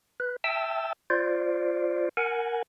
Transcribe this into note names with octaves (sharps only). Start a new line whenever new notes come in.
B4
E5 G5 A5 E6
F4 C5 D5
A#4 F#5 G#5